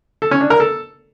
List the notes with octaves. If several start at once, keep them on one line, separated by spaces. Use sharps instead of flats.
A4
C#4
D4
A#4
A4